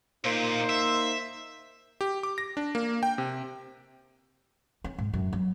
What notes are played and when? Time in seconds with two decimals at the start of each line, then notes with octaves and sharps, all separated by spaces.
0.24 A#2 A#3 D#4 C5
0.69 E5
2.01 G4
2.23 D6
2.38 A#6
2.57 D4
2.75 A#3
3.03 G5
3.18 C3
4.84 C#4
4.98 G#2
5.14 F#2
5.33 F#3